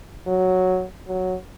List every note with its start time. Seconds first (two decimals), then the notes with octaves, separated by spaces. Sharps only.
0.27 F#3
1.07 F#3